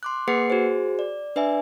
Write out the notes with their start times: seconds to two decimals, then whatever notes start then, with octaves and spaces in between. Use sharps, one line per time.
0.03 C6 D6 F#6
0.28 A#3 G#4 B4 F#5 C7 C#7
0.50 F#4 G#4 C5
0.99 D5
1.36 D4 B4 D5 E5 G#5